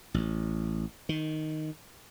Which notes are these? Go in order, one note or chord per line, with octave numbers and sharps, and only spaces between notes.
A1
D#3